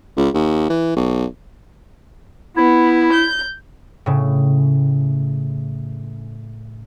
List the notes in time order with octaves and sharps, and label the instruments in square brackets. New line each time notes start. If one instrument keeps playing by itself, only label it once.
[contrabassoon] C#2
D#2
E3
B1
[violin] B3 [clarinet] E4
[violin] G6
[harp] A2 C#3